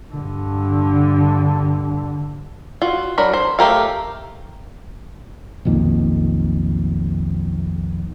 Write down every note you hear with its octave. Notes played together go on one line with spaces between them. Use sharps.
G2 D3
F4 F#4
F#3 D4 A#4 B5
C5
A3 G4 A#4 F5
B1 F2 D#3 A#3